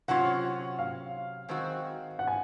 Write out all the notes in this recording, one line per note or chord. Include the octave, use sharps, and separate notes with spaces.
C3 F#3 C#4 F4 F#5
F5
D#3 G#3 C4 F#4
F#5
G#5